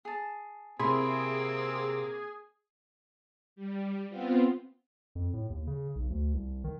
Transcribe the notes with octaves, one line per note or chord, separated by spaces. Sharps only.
G#4 A5
C3 A#3 C4 E4 G#4 B5 C6
G3
B3 C4 F4
F2
A2
D#2
C#3
B1
D2
C2
D#3